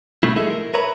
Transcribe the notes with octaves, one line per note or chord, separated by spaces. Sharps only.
B2 A3 A#3 E4
G#3 G#4 A4 E5
A#4
A#4 B4 C#5 E5 A#5 B5